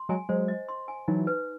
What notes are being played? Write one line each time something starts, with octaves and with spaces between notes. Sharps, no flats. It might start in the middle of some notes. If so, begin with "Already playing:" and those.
Already playing: C6
F#3 G#3 G#5
F#3 G#3 C5
D#5
C6
G#5
E3 F#3 D#4
B4